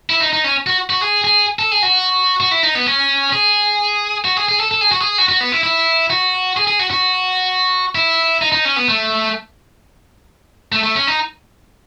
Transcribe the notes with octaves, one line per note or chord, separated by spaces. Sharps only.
E4
D#4
D#4
C#4
F#4
F#4
G#4
G#4
A4
G#4
F#4
F#4
E4
D#4
B3
C#4
G#4
F#4
G#4
G#4
A4
A4
G#4
F#4
G#4
F#4
F#4
B3
E4
E4
F#4
G#4
G#4
F#4
F#4
E4
D#4
D#4
C#4
B3
A3
A3
A3
C#4
D#4